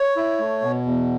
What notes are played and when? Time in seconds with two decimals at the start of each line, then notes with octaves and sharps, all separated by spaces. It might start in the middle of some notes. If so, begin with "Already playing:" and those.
Already playing: C#5
0.16 E4
0.39 A3
0.62 B2
0.85 E2